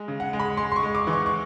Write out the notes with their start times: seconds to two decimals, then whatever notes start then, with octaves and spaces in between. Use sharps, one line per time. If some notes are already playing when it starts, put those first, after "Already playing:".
Already playing: G#3
0.08 C#3
0.20 F#5
0.33 G#3
0.39 B5
0.57 G#3 C6
0.72 C6
0.76 C#6
0.83 G#3
0.95 D6
1.07 E3
1.13 C#6
1.26 C#6